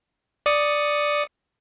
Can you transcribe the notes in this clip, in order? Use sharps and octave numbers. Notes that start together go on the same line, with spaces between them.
D5 D#6 C#7